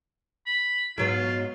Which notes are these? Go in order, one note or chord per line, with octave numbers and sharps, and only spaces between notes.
B5
G#2 F#3 B3 F4